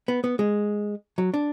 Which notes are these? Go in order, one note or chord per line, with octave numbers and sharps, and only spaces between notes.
B3
B3
G#3
F#3
D4